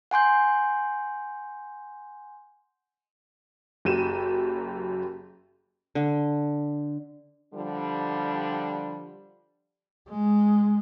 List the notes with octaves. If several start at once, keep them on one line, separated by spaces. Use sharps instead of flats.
F#5 G#5 C6 G6
F#1 F#2 G4 D#7 E7
D3
D3 F3 G3
G#3